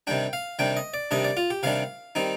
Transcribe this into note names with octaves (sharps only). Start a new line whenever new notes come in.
C3 D#3 G3 D4 G5
F5
C3 D#3 G3 D4 G5
D#5
D5
C3 D#3 G3 D4 D#5
D5
F4
G4
C3 D#3 G3 D4 F5
D#3 G3 C4 D#4